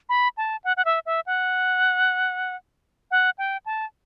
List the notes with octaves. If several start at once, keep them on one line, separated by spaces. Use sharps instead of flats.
B5
A5
F#5
F#5
E5
E5
F#5
F#5
G5
A5